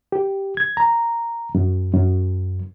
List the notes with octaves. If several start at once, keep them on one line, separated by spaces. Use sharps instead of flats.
G4
G#6
A#5
F#2
F#2